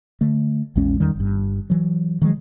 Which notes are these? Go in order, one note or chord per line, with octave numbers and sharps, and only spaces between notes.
D3 A3
A#1 E2 G#3 C#4
E2 D#3 G3
G1 G2
E3 F#3
D#3 F3 F#3 G#3